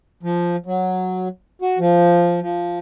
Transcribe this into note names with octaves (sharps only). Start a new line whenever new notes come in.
F3
F#3
F#4
F3
F3